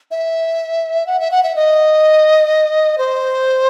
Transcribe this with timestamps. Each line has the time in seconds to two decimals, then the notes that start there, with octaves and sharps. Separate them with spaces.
0.11 E5
1.07 F#5
1.20 E5
1.31 F#5
1.43 E5
1.56 D#5
2.98 C5